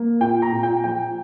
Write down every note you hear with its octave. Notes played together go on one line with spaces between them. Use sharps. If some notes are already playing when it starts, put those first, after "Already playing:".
Already playing: A#3
A#2 G5
A#5
A#2
G5
F3 G5